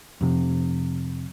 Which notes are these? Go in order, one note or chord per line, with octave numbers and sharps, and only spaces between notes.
F2 C3